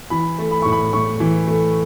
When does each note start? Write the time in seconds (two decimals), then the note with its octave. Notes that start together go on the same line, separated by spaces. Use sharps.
0.10 E3 B5
0.39 A3
0.51 B5
0.62 A2 C#6
0.72 B5
0.93 A2 C#6
1.20 E3
1.47 A3